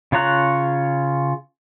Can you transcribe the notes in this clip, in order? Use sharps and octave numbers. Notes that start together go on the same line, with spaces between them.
C#3 F4 C#5 A#5 F#6